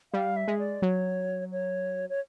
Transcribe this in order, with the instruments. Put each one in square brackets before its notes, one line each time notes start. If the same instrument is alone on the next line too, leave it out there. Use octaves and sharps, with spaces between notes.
[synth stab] G3 [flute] F5
[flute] E5
[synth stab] G#3
[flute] D5
[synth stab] F#3 [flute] C#5
[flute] C#5
C#5